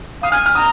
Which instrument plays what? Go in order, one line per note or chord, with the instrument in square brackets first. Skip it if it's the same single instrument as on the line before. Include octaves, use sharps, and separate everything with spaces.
[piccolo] F5 [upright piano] D#6
[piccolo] G#5 [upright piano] F6
[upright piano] F6
[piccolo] A#5 [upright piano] D#6